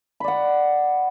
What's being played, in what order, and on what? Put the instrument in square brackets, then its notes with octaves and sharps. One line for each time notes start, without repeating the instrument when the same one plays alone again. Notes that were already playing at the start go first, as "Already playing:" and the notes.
[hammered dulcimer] B5
D5
F#5